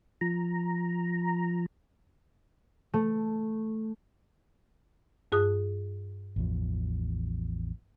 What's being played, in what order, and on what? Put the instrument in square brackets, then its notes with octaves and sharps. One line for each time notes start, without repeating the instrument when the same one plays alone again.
[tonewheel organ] F3 A#5
[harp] A3
[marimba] G2 G#4 D#6
[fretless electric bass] A1 E2 F3